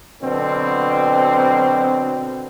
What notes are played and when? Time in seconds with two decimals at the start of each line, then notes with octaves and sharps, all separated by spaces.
0.21 B2 D3 F#3 B3 C4